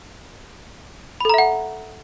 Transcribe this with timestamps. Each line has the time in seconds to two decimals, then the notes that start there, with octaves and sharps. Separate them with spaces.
1.21 B5
1.25 A4
1.29 A#5
1.34 E5
1.38 F#5